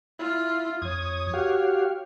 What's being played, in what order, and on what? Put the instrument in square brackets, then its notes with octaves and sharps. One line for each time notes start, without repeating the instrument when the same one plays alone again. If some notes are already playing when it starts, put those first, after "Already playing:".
[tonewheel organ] E4 [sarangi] F4
[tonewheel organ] F2 D#6 G#6 [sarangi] C#5
[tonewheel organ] F#4 G4 F5